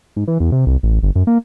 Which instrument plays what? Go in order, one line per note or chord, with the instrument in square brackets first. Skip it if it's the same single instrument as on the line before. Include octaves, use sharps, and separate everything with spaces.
[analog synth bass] G#2
E3
E2
C3
C2
A1
G1
F#2
A#3